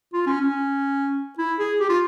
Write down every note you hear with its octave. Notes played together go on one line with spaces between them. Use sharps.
F4
C#4
C#4
E4
G#4
G4
F4